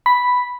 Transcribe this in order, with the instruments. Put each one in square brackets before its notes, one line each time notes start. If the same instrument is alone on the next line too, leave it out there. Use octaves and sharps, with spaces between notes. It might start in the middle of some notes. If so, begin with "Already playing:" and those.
[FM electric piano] B5